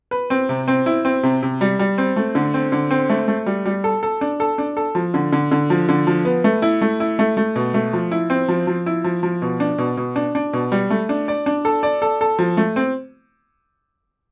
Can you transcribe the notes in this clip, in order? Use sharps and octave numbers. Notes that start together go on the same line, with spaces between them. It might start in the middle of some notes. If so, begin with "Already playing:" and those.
B4
C4
C3
C4
E4
C4
C3
C3
G3
G3
C4
A3
D3
C4
D3
C4
A3
A3
G3
G3
A4
A4
D4
A4
D4
A4
F3
D3
D3
D3
F3
D3
F3
B3
A3
E4
A3
E4
A3
A3
B2
A3
F3
E4
C4
F3
F3
E4
F3
F3
B2
D4
B2
B2
D4
D4
B2
G3
A3
D4
D5
D4
A4
D5
A4
A4
F3
A3
C4